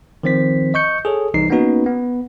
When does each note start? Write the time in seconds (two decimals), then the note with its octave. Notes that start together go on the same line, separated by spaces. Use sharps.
0.23 D#3 F3 C4 C5 B6
0.74 D#5 C#6 G6 C#7
1.05 G#4 A4 C#5
1.34 C2 E3 D#4 C7
1.50 A#3 B3 C#4 D#4 F#4 B4
1.86 B3